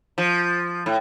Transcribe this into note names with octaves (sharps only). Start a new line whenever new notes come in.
F3
A2